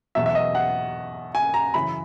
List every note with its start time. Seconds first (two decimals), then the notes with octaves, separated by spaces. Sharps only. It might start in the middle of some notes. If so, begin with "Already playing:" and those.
0.15 E2 B2 F#3 E5
0.26 E5
0.35 D#5
0.55 F#5
1.35 G#5
1.54 A#5
1.74 F#2 C#3 E3 B5